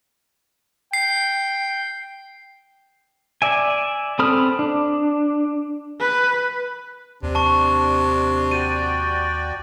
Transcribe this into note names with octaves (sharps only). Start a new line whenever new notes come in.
G5 C7
D5 E5 G#5
C4 A4 B5 D#6 F6
D4
B4
D#2 C3 D4
A5 C#6
F#4 D5 G5 D#7